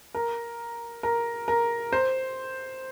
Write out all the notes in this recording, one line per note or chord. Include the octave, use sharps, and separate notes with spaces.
A#4
A#4
A#4
C5